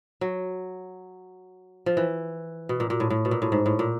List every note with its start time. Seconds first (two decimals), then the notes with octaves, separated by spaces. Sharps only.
0.21 F#3
1.86 F3
1.97 E3
2.69 B2
2.80 A#2
2.90 A#2
3.00 A2
3.10 A2
3.25 B2
3.31 A#2
3.42 A2
3.52 G#2
3.66 A2
3.79 A#2